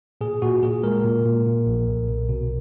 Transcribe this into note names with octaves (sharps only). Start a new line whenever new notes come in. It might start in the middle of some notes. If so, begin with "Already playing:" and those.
A#2 G#4
A#2 F#4
A#2 G#4
G#3 A#4
A#2
A#2
A#2
A#1
B1
B1
B2